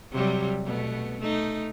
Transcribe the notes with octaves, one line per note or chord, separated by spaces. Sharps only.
C3 F#3 G3
B2 A3 B3
A3 D#4